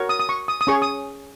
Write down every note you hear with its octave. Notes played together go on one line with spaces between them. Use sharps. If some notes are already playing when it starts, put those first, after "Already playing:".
Already playing: F#4 A#4 C#5
D#6
D#6
C#6
D#6
D#6
C#4 G#4 C#5 C#6
D#6